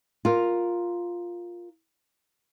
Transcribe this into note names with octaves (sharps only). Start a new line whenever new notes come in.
F4 A#4